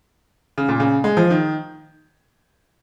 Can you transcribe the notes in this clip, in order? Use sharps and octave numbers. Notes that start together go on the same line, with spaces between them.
C#3
A#2
C#3
G#3
F3
D#3